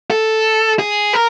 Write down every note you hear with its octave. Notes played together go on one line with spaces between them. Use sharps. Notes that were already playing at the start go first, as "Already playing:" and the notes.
A4
G#4
A#4